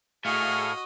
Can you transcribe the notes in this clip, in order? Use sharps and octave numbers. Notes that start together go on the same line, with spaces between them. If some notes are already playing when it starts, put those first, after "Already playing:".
A2 F#4 G#4 D#5 F5 C#6 F6